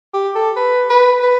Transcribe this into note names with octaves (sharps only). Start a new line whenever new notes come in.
G4
A4
B4
B4
B4